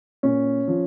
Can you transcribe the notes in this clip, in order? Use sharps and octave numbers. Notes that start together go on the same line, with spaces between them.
A#2 C#4
F3